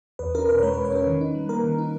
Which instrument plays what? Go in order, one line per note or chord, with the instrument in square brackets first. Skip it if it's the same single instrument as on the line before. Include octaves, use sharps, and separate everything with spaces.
[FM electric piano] E2 B4
C#4 A#4
B2 B4
C#5
G#3 B4
E2 B4
C#5
C#4 B4
D#3
D#4
G3
A#3 A#4
D#3
D#4